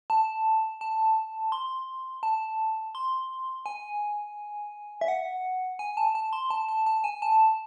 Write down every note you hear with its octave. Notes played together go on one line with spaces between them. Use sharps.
A5
A5
C6
A5
C6
G#5
E5
F#5
G#5
A5
A5
C6
A5
A5
A5
G#5
A5